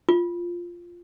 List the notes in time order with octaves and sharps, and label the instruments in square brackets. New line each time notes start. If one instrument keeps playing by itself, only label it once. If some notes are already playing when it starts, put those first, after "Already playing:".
[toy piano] F4